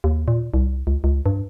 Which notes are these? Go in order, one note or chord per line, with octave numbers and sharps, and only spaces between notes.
D#2
A#2
C2
C#2
C#2
G2